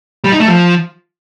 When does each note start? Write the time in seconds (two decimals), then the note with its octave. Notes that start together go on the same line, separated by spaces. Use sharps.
0.24 G3
0.32 D#4
0.40 A3
0.48 F3